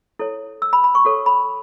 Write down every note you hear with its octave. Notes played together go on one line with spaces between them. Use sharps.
E4 A4 C#5
E6
B5
B5
C#6
F#4 A4 C#5
B5